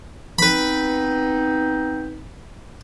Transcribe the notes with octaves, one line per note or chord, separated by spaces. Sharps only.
B3 C4 D#4 B4 B5